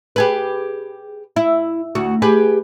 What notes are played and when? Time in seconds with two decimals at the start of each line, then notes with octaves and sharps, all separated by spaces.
0.16 G4 G#4 B4
1.36 E4
1.95 D2 F#4
2.22 G4 G#4 B4